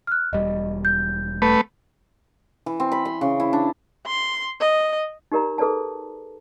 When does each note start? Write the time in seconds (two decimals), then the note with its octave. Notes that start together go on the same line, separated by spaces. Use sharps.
0.07 F6 F#6
0.33 E1 G3 D#5
0.85 G6
1.42 A3 B4
2.66 E3
2.80 C4
2.92 B5
3.05 C6
3.21 C#3
3.40 E4
3.53 D4
4.06 C6
4.61 D#5
5.32 D#4 G4 A#4 D5 A#5
5.58 G#4 A4 B4 D5 A5